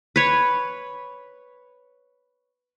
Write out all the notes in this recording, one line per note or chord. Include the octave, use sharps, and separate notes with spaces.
B4 C#5